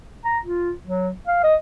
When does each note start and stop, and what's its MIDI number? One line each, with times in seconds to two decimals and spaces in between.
0.25 0.39 82
0.46 0.71 65
0.85 1.10 54
1.28 1.39 77
1.44 1.56 75